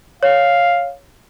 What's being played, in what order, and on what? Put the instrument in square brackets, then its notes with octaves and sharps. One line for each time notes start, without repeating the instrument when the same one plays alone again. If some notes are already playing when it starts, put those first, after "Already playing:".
[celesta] C#5 [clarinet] F5